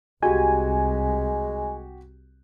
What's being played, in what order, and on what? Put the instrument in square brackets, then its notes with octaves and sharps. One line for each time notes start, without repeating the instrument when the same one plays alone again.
[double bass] C2 [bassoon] G#3 [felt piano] F#4 G4 [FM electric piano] G#5